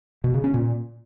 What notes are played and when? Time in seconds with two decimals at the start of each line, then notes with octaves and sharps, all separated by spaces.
0.24 B2
0.34 C#3
0.44 C#4
0.54 A#2